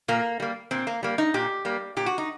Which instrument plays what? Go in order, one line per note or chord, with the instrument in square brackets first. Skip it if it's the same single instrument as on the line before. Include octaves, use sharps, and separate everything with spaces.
[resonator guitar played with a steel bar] A#2 A#3
G3 A#3
A#2 C4
A#3
G3 A#3
D#4
A#2 G4
G3 A#3
A#2 G4
F#4
D#4